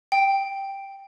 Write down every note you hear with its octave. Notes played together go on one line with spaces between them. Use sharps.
G5